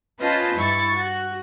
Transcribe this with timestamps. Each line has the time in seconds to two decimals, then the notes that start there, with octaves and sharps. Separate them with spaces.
0.19 C#4 F4 B4 C5 D#5 A5
0.55 G2 E4 C#6 A6
0.93 F#4